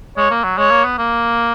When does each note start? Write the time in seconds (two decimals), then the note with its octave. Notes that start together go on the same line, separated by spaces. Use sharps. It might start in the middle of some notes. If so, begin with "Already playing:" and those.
0.18 G#3 C#5
0.30 A#3
0.44 F#3
0.58 G#3 C#5
0.71 A#3
0.85 B3
0.98 A#3